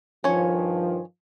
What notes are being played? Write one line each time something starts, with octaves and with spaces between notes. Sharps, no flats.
G2 D#3 F3 C#4 C#5